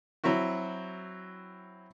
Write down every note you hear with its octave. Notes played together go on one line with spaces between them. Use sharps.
F#3 C4 E4 F#4